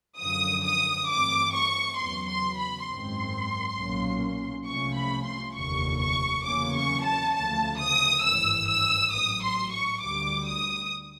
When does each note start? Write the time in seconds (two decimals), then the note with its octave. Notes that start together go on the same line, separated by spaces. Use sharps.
0.20 F#2 D3 F3 D#6
0.65 D#6
1.09 G2 E3 A3 C4 D6
1.54 C#6
1.99 E2 C#3 F#3 B3 C6
2.29 C6
2.59 B5
2.88 G#1 F#2 D#3 G#3 C4 C6
3.77 B1 A#2 F#3 A#3 C#4
4.67 C2 C3 F3 A3 C#4 C#6
4.97 B5
5.26 C6
5.56 F1 D#2 D3 C#6
6.01 C#6
6.45 E2 C#3 F#3 A#3 C#4 D6
6.75 C#6
7.05 A5
7.35 D2 C#3 F3 A3 A5
7.80 D#6
8.24 G#1 G2 E3 E6
8.69 E6
9.13 A1 A2 F#3 D#6
9.43 C6
9.74 C#6
10.02 D2 D3 G3 D6
10.48 D#6